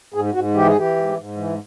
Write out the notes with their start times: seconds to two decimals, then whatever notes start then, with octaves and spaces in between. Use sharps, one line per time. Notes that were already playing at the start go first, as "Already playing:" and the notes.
0.14 G#2 G#4
0.34 G#2 F#4
0.54 E3 G4
0.66 G#4
0.75 E3 G4
0.96 G#2
1.17 G#2
1.37 E3